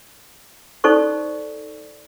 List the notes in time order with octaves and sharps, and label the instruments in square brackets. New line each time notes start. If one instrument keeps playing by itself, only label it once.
[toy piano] D#4 A4 C5 D5 C#6